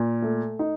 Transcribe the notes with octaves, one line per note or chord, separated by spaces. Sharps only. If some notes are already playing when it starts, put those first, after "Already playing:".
Already playing: A#2
A3
D#4